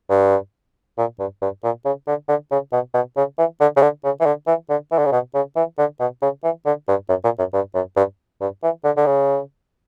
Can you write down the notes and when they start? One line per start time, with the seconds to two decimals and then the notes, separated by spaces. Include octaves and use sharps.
0.10 G2
0.98 A#2
1.19 G2
1.42 G2
1.64 A#2
1.85 C#3
2.07 D3
2.28 D3
2.51 C#3
2.73 B2
2.94 B2
3.16 C#3
3.38 E3
3.60 D3
3.77 C#3
3.82 D3
4.04 C#3
4.20 E3
4.26 D3
4.47 E3
4.69 D3
4.92 E3
4.98 D3
5.06 C#3
5.12 B2
5.35 C#3
5.56 E3
5.78 D3
6.00 B2
6.22 C#3
6.43 E3
6.65 D3
6.88 G2
7.09 F#2
7.24 A#2
7.39 F#2
7.53 G2
7.74 F#2
7.96 G2
8.41 G2
8.63 E3
8.84 D3
8.97 D3
9.06 C#3